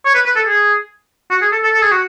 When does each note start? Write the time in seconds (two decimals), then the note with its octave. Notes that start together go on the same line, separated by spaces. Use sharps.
0.05 C#5
0.15 B4
0.25 B4
0.36 A4
0.48 G#4
1.31 F#4
1.42 G#4
1.52 A4
1.63 A4
1.74 A4
1.82 G#4
1.91 F#4